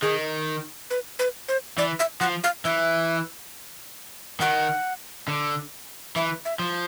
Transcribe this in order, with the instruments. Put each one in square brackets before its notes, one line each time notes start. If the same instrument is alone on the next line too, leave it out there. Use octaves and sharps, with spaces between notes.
[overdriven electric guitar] D#3 [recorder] G#4
[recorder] B4
B4
C5
[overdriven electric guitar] E3 [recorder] D5
[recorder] E5
[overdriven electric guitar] F3 [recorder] F#5
[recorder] F5
[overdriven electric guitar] E3 [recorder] E5
[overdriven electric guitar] D#3 [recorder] F#5
[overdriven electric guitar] D3
[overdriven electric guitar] E3 [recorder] E5
[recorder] E5
[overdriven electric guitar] F3